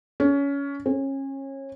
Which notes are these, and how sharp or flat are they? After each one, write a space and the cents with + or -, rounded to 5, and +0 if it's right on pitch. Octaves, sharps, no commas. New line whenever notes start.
C#4 +20
C#4 -30